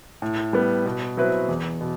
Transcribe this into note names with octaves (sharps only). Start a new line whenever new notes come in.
A2
G3 B3
B2
F#3 C4 E4 B4
E2
B2